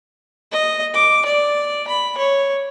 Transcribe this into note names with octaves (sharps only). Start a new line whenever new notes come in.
D#5
D6
D5
B5
C#5